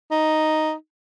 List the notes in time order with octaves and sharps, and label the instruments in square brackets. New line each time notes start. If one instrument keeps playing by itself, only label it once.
[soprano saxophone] D#4